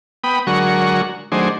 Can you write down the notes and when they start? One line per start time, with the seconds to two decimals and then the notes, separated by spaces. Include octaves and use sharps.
0.24 B3 G5 B5 D#6
0.47 D3 F#3 G#3 F#4 A#4 C#6
1.32 D#3 F#3 A3 D4 G#4 C5